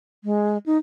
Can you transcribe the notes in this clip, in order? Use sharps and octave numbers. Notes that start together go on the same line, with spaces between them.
G#3
D#4